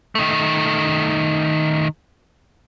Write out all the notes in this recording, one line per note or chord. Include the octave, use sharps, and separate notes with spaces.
D#3 A3